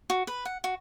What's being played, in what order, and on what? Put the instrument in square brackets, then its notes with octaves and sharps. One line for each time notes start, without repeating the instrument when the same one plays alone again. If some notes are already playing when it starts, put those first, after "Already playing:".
[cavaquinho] F#4
B4
F#5
F#4